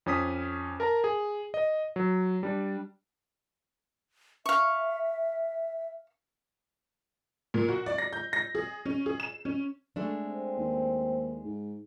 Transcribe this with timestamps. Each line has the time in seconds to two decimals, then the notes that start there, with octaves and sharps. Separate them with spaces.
0.06 F2 C#4 D#6 B6
0.80 A#4 A5 A#5
1.04 G#4
1.54 D#5
1.96 F#3
2.43 G3 D4
4.46 E5 F5 C#6
7.54 A#2
7.69 F#4
7.86 D5
7.98 A#6
8.13 G6
8.33 A#6
8.55 G#4
8.85 C#4
9.06 G#4
9.20 E7
9.45 C#4
9.96 G#3 A3 D4
10.27 C4
10.57 D#2
11.44 G#2